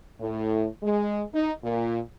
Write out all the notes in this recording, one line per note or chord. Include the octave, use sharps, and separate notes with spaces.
A2
G#3
D#4
A#2